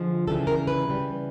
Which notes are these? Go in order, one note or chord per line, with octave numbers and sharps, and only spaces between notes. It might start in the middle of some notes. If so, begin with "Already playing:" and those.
Already playing: D3 F3 G#3
C#3 E3 G3 A4
A#4
B4
C#3 E3 G3